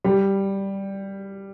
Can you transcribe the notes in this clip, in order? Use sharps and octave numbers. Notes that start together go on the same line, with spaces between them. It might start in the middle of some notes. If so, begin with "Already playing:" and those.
G3